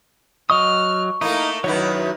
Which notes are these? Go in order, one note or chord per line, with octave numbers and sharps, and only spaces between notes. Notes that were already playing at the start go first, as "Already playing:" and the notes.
F#3 D#5 C#6 D#6 F6
A3 A#3 D#4 E4 A#4
F#2 D#3 F#3 D#4 E4 B4 C#5